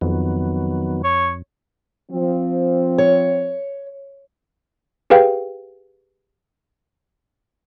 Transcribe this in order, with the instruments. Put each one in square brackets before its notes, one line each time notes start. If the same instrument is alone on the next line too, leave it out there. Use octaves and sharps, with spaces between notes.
[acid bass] F2 [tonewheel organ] D#3 F#3 B3
[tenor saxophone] C#5
[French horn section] F3 C4
[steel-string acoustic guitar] C#5
[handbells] G4 G#4 B4 F5 G5